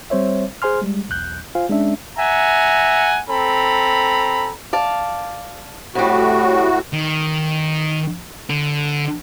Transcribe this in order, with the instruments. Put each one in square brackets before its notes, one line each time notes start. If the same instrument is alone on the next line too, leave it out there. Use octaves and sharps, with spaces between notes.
[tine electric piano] G3 C4 C5 C#5 E5
G#4 C5 G#5 C6 F6
G3 G#3
B1 E2 F#6 G6
F4 C5 F5 G#5
G#3 C#4 D4 E5
[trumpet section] E5 F#5 G#5 A#5
C4 A4 A#5 B5
[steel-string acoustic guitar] D5 F5 A5
[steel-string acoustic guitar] F2 G3 [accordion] A2 F#4
[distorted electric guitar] D#3
D3